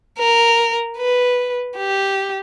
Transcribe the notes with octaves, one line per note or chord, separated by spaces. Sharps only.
A#4
B4
G4